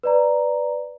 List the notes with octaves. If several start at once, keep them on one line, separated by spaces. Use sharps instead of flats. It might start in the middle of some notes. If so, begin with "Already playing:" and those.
B4 D5 A#5